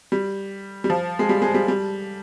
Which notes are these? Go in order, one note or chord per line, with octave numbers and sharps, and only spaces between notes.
G3
G3
F3
G#3
G3
G#3
G3
G3